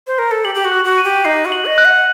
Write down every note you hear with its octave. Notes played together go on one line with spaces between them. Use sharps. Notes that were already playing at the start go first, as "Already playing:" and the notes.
C5
A#4
A4
G4 F#7
G4
F#4
F#6
F#4
D#7
G4
D#4 C7
F#4
F#7
D#5
F#6
F#5